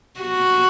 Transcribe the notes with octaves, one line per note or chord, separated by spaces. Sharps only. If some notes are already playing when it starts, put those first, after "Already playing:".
F#4